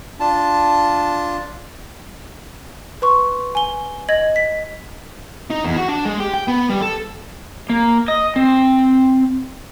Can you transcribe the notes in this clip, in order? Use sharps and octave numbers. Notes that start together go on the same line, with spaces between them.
D4 F4 A5
B4 C6 C#6
G#5 G7
D#5 G#6 F#7
B6
D#4
E2
F#4
D4
G#3
G4
G5
B3
G3
A4
A#3
D#5
C4